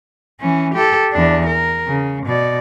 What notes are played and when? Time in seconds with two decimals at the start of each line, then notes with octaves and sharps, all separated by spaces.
0.40 E3 C#4
0.74 G4 A4
1.12 E2 D4
1.47 A#4
1.87 C#3
2.26 B2 D5